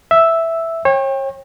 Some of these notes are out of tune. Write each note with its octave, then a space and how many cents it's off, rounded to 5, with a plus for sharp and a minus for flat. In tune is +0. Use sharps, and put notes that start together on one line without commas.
E5 +0 E6 +0
C#5 -35 G5 +20